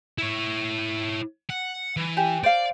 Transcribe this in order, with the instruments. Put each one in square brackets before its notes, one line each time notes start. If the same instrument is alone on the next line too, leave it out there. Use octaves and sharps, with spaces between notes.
[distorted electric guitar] E4 C#5
F#5
E3
[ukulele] G4 G#5
[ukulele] C5 F5 [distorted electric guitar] D5